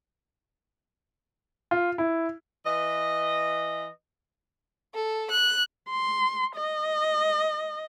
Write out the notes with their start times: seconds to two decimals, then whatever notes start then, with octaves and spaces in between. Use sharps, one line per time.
1.71 F4
1.98 E4
2.65 E3 B4 D#5
4.94 A4
5.30 F#6
5.90 C6
6.56 D#5